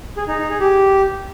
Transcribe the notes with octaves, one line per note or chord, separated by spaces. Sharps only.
G#4
D#4
D#4
G#4
G4